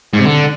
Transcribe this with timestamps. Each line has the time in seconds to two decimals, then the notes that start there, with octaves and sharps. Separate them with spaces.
0.13 G#2
0.19 C3
0.25 D3